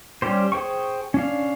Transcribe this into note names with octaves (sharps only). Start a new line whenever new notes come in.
G3 C#4 G4 C5
G#4 C5 G5 C#6
C#4 D4 F5